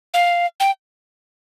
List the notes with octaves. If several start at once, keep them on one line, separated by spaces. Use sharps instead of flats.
F5
G5